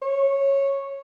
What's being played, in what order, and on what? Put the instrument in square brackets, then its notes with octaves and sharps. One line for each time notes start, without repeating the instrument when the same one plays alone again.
[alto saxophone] C#5